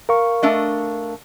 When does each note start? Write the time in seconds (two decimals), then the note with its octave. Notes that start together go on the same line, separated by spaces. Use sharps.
0.09 A#4 F5 C#6
0.43 A3 D4 D#5